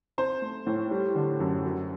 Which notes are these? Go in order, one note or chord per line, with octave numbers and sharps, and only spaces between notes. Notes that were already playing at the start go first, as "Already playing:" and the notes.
C4 C5
A3
A2
G3
D3
F#2
F#3